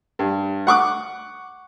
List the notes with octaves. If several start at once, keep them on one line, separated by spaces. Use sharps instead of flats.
G2
F#5 C#6 D6 F#6